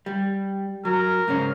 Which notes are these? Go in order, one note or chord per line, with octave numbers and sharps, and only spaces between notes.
G3
F#3 A#4
G#2 C#3 C#4